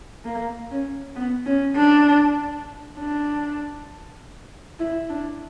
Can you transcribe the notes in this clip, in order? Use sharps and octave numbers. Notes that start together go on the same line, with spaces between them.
A#3
C#4
B3
C#4
D4
D4
E4
D4